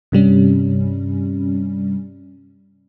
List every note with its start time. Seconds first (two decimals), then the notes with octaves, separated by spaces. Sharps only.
0.12 G2 C3 G3 C#4